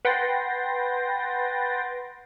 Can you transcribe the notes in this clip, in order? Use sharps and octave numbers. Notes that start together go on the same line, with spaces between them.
B4 F#5 G5 C6 A6 A#6